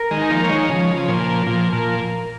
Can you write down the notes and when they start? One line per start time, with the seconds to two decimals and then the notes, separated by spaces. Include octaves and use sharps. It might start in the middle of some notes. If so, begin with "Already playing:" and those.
Already playing: A#4
0.11 D#3 G#3
0.17 D#4
0.30 F3 A#3
0.44 C#5
0.49 D#3 G#3
0.69 C#3 F3
0.95 F3
1.08 A#2
1.21 A#4
1.47 A#2 F3
1.73 A#2 A#4